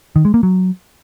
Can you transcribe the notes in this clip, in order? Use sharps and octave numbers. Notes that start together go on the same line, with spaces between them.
D#3
G#3
A#3
F#3